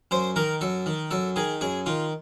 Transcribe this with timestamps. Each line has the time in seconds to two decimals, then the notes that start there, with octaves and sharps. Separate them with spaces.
0.11 F#2 C5
0.36 D#3 A#4
0.61 F#2 A4
0.86 D#3
1.11 F#2 A4
1.36 D#3 G#4
1.61 F#2 G#4
1.86 D#3 F4